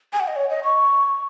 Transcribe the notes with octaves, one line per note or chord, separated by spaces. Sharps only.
G#5
F#5
D#5
C#5
D#5
C#6